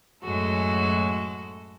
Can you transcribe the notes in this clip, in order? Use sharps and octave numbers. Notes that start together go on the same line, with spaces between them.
F#2 A2 G#3 F#4 A4